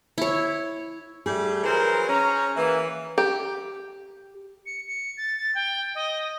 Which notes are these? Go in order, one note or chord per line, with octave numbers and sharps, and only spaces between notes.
E4 C#5
G3 A3 G#4
E3 F#3 A#4 C5
C#4 A#5
E3 A#3
G4
C#7
C#7
A6
A6
G5
D#5